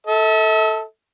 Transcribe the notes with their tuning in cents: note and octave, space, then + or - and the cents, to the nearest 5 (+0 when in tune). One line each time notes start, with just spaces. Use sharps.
A4 +0 E5 -40